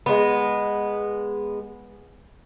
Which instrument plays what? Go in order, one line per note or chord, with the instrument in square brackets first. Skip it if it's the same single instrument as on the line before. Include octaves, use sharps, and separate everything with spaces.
[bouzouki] G#3 B3